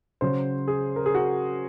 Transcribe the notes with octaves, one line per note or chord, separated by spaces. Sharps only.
C#3 F#3 C5
G#4
A#4
G#4
F#4